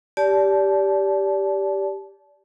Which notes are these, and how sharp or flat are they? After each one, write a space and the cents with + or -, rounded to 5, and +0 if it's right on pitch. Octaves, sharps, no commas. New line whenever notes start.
G4 +0 D5 -25 A5 -25